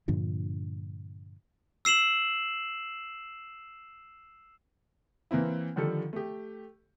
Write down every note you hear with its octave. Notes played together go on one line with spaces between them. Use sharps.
G2 A#2 D3 F3
E6 C7 E7 F#7
E3 A#3 C4 E4
D3 D#3 F3 G3 A4
A3 G4